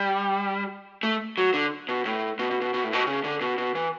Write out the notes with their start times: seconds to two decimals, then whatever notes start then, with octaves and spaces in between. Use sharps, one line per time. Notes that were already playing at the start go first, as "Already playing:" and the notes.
Already playing: G3
1.03 A3
1.38 F#3
1.54 D3
1.89 B2
2.05 A2
2.39 B2
2.51 B2
2.61 B2
2.74 B2
2.84 A2
2.93 B2
3.07 C#3
3.24 D3
3.41 B2
3.58 B2
3.75 E3